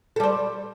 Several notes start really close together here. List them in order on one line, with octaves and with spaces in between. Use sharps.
A4 G3 C5